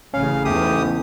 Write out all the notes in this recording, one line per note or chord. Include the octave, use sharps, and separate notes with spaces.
A1 C#3 C#4 F5
E2 G#2 A3 G4 D#6